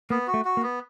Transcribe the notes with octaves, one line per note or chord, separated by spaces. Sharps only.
A#3 B3
F#4
A3
F#4
A#3
B3